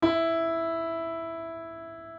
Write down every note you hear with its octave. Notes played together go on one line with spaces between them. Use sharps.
E4